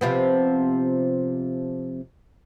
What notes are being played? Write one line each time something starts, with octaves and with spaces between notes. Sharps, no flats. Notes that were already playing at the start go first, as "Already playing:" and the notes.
C3 F3 B3